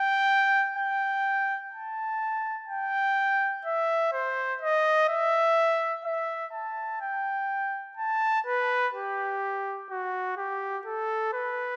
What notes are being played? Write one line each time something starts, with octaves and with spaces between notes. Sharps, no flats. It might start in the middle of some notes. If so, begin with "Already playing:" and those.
Already playing: G5
G5
A5
G5
E5
C5
D#5
E5
E5
A5
G5
A5
B4
G4
F#4
G4
A4
B4